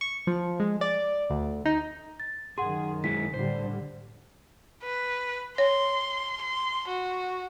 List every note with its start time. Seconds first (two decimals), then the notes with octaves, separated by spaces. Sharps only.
0.01 C#6
0.27 F3
0.60 G#3
0.81 D5
1.30 D2
1.65 D#4
2.20 A6
2.58 F#2 D#3 G#4 F#5 C6
3.04 G#3 E4 G#4 B6
3.34 A2 D3 G3 C5
4.83 B4
5.58 C#5 C6
6.41 C6
6.88 F#4